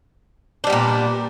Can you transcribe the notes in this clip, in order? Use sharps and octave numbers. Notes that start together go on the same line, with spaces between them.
A#2 G3 B3 D4